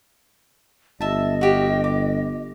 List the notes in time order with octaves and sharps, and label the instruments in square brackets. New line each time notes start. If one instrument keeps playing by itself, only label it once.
[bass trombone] G1 [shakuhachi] D#5 [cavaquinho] E5 A5
[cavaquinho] F#4 G4 F5
D6